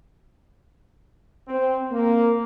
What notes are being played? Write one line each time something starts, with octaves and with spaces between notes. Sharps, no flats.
C4
A#3